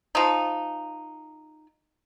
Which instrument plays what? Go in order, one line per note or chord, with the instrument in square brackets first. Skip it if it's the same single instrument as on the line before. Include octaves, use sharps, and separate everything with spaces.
[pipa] F3 D#4